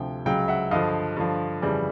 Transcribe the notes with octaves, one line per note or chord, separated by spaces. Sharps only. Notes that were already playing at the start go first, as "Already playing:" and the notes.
Already playing: D2 C3 F3 G5
C#2 C#3 F#3 F5 G5
E5 F#5
G2 D3 F3 D#5 F5
G2 D3 F3
F2 C#3 E3 G3